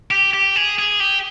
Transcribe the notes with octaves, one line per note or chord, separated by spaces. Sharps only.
G4
G4
G#4
G#4
G4